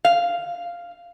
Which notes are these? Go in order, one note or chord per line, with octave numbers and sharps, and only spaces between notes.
F5